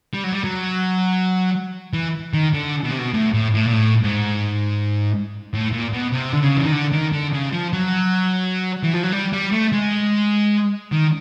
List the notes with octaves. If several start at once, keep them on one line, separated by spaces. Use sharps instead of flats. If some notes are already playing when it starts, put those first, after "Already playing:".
G3
F#3
G3
F#3
E3
D#3
D3
B2
C3
B2
A2
A2
A2
A#2
A2
G#2
A2
A#2
B2
C3
D3
C#3
E3
D#3
D3
D#3
D3
C#3
F3
F#3
E3
F3
F#3
G3
G3
A3
G#3
D#3